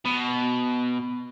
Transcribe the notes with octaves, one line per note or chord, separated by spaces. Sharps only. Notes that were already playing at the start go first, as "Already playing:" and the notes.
B2